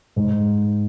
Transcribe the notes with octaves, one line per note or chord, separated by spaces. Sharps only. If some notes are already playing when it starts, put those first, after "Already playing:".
G#2